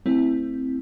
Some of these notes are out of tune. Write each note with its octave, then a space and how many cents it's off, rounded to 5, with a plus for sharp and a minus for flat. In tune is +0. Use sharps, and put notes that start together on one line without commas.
A3 +10 C4 +0 E4 +0